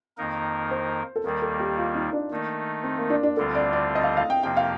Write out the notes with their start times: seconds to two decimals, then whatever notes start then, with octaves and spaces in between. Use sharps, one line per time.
0.18 F2 D#3 A#3 D#4 A#4
0.71 C5
1.16 A4
1.24 D#2 D#3 G3 A#3 A#4
1.42 A4
1.60 G4
1.77 F4
1.95 D#4
2.13 D4
2.31 D#3 A3 A#3 D#4
2.83 C4
2.97 A#3
3.10 D4
3.23 D4
3.37 D2 D3 G3 C4 F4 A4
3.55 D5
3.73 D5
3.95 D#5
4.03 F5
4.17 F5
4.30 G5
4.43 F2 C3 F3 A#3 G5
4.57 F5